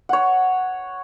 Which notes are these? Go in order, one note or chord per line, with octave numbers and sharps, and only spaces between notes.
C#5 F#5